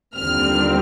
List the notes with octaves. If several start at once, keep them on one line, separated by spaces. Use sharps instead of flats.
D#2 D3 G3 C4 F4 F6